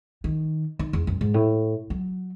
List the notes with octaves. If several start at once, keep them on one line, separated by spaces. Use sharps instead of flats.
D#3
D#3
E2
F#2
G#2
A2
F#3